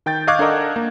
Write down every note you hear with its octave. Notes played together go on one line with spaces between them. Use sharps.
D#3 G5 G6 A6
D#5 F5 C#6 D6 F#6 G#6
D4 A4 A#4 D#5 F#5
A#3